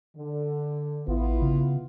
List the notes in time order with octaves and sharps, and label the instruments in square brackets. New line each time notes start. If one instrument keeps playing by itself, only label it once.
[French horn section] D3
[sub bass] A1 [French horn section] B3 E4 F4
[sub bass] C#3